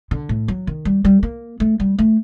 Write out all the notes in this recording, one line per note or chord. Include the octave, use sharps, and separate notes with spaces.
D3
A2
F#3
D#3
G3
G3
A#3
A3
G3
A3